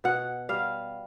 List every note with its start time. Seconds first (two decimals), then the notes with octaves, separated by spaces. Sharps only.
0.04 B2 F#5
0.49 G3 F5